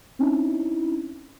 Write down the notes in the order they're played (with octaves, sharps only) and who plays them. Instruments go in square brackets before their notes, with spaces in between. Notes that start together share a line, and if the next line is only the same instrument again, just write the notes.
[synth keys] C4 C#4 D#4 E4